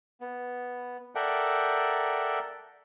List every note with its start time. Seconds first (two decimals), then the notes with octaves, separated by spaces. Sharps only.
0.21 B3
1.15 A4 A#4 D5 E5 F#5 G5